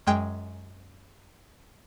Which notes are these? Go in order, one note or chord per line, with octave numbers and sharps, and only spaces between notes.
F#2 G#3 G5